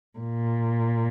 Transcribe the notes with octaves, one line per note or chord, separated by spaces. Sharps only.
A#2